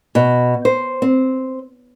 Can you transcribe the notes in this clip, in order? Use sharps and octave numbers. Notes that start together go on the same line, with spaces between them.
B2
C5
C4